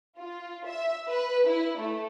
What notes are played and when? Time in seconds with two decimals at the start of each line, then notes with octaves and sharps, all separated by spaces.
0.18 F4
0.66 E5
1.09 B4
1.47 E4
1.78 A3